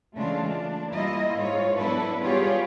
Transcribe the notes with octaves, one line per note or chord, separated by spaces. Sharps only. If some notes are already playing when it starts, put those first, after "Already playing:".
C#3 E3 G#3 A3 D4 F4
D4
G3 A#3 E4 F4 D#5
G#2 F4 C#5
F#3 B3 D4 E4 A4 B4
G3 B3 F4 G4 G#4 C#5